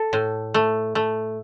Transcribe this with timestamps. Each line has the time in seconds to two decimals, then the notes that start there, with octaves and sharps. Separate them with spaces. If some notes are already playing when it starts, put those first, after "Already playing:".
Already playing: A4
0.13 A2
0.54 A3
0.95 A3